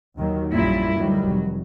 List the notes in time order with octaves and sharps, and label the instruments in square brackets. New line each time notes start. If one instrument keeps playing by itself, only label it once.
[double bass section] D#2 D#3 F#3
[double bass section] A#1 G3 [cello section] F#2 A#2 E4
[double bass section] D2 D#3 G3 [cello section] F#3
[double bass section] F1